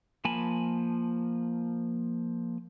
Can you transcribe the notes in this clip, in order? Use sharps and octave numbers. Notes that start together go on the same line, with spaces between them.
F3 A#3 G#5 A5 B5